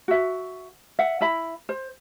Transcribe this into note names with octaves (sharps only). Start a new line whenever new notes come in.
F#4 E5
E5 F#5
E4 E5 B5
C5